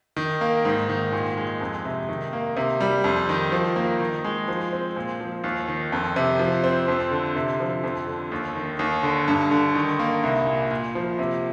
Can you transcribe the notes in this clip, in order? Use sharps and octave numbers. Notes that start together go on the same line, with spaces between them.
D#3
A#3
G#2
D#3
A#2
G#3
F2
C3
D#3
A#3
C3
G3
F2
D#3
F3
A#3
D#3
G#3
F3
C4
A#2
F3
D#2
D#3
F2
C3
F3
C4
F2
D3
C3
F3
F2
D3
D#2
D#3
D#2
D3
G2
D3
D#3
A#3
C2
A#2
A#2
F3
C3